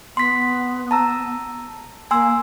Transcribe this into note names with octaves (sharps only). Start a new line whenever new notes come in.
B3 C6 B6
A5 A#5 E6
A#3 G#5 C6 E6